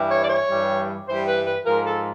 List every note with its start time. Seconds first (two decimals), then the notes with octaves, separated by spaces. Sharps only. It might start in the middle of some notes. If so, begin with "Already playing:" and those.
Already playing: G2 E3 G3
0.10 C#5
0.23 D5
0.30 C#5
0.49 G2 E3 G3
1.07 G2 E3 G3 C5
1.27 B4
1.46 B4
1.65 G#2 F3 A#4
1.85 A4